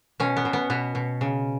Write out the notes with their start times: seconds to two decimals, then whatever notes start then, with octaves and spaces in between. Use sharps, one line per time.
0.20 B2 C#4
0.37 B3
0.45 B2
0.53 B3
0.70 B2 B3
0.95 B2
1.21 C#3